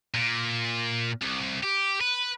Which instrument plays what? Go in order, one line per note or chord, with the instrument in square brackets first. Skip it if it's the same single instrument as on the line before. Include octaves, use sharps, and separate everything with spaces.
[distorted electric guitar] A#2
C2
G4
B4